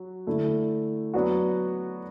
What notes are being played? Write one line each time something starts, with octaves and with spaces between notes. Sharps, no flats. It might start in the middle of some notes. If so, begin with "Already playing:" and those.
Already playing: F#3 F#4
D3 A3 E4
F#3 B3 D4 F#4